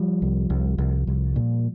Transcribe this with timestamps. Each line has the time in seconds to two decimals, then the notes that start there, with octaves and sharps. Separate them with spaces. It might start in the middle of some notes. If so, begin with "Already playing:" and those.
Already playing: F3 G3
0.22 C2
0.50 C2
0.78 C2
1.07 C2
1.36 A#2